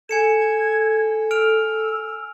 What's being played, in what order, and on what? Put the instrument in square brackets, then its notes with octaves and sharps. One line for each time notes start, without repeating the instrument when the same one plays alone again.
[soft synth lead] A4 [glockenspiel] G#5 C#7 E7 [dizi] G#6
[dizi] E6 [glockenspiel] F6 D7 F7